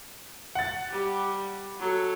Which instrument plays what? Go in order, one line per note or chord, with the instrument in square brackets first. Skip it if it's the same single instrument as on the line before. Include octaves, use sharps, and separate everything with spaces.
[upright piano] F#5 A6
[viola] G3 G4
F#3 A4